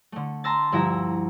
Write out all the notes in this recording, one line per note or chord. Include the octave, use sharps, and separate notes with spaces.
D3 A3
A5 A#5 C6 E6 A6
D2 G2 F3 E4 E5 A#5